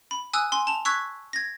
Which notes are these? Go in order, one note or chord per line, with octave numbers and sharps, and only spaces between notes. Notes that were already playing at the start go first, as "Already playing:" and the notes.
B5
G#5 D#6 E6 F#6
G#5 C6
A5 F7
C#6 E6 F#6 G#6 B6
G#6 A#6